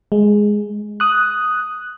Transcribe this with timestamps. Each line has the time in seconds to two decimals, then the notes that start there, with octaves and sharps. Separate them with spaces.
0.12 G#3
1.00 D#6 F#6